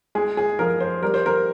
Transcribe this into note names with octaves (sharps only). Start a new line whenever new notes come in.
G#3 G#4
G#4
F3 A#4
C5
G3 A#4
C5
A#4